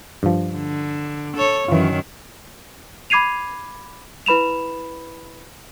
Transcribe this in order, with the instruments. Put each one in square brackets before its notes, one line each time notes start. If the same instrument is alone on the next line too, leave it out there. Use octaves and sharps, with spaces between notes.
[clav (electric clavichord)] G2 F3
[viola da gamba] D3
A4 C#5
[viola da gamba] F#2 D#3 [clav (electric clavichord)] E3 F4
[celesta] B5 D6 G#6 C7 D#7 F7
E4 B4 B5 E7 F7